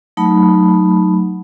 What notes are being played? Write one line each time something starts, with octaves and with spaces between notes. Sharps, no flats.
F#3 A3 D#4 A5 B5